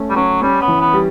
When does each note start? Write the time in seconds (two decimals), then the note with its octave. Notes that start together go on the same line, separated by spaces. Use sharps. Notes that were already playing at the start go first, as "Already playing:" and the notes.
Already playing: A3 C#4
0.10 G3
0.16 F#3 C#4
0.42 G3 C#4
0.61 B3
0.68 E3
0.80 B3
0.94 G3